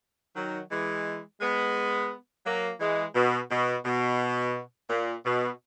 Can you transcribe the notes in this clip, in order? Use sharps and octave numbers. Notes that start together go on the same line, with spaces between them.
D#3 F#3
E3 G#3
G#3 B3
F#3 A#3
E3 G#3
B2
B2
B2
A#2
B2